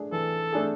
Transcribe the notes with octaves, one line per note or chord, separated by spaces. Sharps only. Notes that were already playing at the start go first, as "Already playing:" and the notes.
Already playing: A3 D4 G#4
E3 A4
A3 D4 G#4